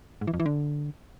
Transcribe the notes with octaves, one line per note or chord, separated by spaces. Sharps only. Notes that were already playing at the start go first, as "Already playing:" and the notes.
G#2
E3
F2
E3
D3